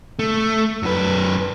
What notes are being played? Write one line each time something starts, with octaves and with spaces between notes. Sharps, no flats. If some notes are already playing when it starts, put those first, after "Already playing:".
A3
F#2 B4